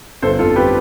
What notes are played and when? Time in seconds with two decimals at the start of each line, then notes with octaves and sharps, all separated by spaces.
0.22 G1 A4 C5
0.39 F2 F4 A4
0.56 G3 G4 B4